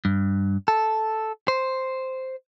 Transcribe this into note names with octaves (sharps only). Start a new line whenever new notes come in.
G2
A4
C5